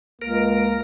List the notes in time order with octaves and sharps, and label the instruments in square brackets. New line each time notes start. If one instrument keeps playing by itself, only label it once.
[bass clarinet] C#2 [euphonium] A#3 [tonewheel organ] A#4